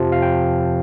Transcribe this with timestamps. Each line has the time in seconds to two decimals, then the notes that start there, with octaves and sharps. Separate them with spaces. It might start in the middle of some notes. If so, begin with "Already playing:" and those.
Already playing: F2 C3 F3 A5
0.12 F5
0.22 G5